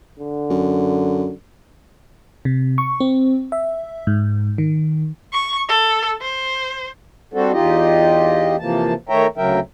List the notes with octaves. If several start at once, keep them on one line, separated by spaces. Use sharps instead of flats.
D3
F#2
C3
C#6
C4
E5
G#2
D#3
C#6
A4
C5
G3 C4 D4 F#4 A4
E2 D#4 F4 G4 D#5
C3 E3 F3 A#3 A5
D#3 A3 C#5 E5 G5 A#5
D2 C#3 F#3 A#4 E5 G5